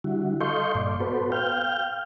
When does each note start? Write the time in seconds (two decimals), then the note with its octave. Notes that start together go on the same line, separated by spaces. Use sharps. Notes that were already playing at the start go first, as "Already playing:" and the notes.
0.04 D3 G3 E4 F#4
0.40 A4 D#5 F5 C6 C#6 G6
0.75 G2 A#2 D5
1.00 B3 F#4 A4 B4 C5
1.32 F5 G5 F6 G6